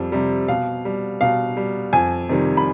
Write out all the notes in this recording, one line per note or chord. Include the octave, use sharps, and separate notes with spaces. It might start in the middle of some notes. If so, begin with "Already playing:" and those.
Already playing: F2 C3 G3
C3 G3
B2 F5
G3
B2 F5
G3
F2 G#5
C3 D#3 G3
B5